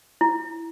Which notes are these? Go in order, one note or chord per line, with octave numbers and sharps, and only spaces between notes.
E4